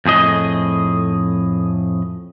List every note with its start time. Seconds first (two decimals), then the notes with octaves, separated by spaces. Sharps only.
0.06 F2 A2 G#4 D#5